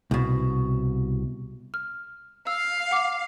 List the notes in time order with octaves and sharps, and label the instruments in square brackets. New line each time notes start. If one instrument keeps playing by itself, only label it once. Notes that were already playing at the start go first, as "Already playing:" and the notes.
[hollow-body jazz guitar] C2 B2
[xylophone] F6
[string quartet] F5 [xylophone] E6
[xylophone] F#5 D6